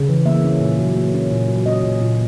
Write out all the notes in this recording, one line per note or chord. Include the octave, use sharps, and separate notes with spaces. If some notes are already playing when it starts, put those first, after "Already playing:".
Already playing: C#3
E3
A#3 E5
C#4
A#2
F#3
A#3
C#4
A#2
F#3
C#4 D#5
A#2
A#2